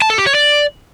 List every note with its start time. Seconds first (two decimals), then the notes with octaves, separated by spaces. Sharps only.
0.02 A5
0.10 A4
0.18 G4
0.26 C#5
0.35 D5